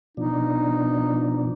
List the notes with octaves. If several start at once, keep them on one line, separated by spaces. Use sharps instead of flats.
B2 F3 D4 D#4